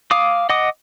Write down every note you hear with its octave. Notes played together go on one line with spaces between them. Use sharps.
F5 D6 D#6
D#5 F#5 D6 D#6